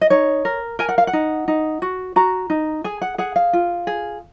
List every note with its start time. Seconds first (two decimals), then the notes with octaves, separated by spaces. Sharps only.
0.01 D#5
0.10 D#4 C#5
0.45 A#4
0.79 A#4 G#5
0.89 F#5
0.98 F5
1.07 F#5
1.13 D#4
1.48 D#4
1.82 F#4
2.16 F#4 A#5
2.50 D#4
2.84 G#4 G#5
3.02 F#5
3.18 G#4 F#5
3.36 F5
3.53 F4
3.87 G#4